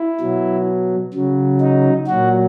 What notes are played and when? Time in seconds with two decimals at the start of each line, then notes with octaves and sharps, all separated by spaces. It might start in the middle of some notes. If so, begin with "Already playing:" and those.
Already playing: E4
0.20 B2 F#3
1.14 C#3 F#3
1.61 D#4
2.07 A#2 F#3 F#4